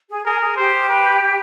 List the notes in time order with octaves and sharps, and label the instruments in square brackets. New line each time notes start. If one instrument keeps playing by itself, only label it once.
[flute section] G#4
[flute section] G#4 [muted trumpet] A#4
[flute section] G#4
[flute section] G4 [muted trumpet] C5
[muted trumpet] B4